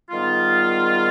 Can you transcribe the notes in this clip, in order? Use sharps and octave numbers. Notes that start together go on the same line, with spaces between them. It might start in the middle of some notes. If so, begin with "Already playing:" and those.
G#2 D#3 G3 B3 F4